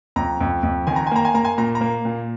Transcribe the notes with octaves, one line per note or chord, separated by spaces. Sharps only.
F2 A#5
F2
F2
D#3 G#5
A#5
G#5
A#3 A#5
G#5
A#3 A#5
G#5
A#2 A#5
A#5
A#3
A#2